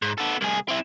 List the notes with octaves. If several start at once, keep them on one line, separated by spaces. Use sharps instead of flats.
G#2
B3 A4
C2 G#4
C4 E4